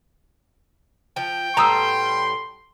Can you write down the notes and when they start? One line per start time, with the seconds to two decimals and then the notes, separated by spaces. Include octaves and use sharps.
1.16 F3 G5
1.57 A2 G3 B3 A#5 C6 D#6 E6